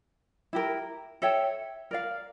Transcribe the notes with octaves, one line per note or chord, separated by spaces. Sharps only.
E4 G4 A#4
A4 C#5 E5 G5
A#4 D5 F5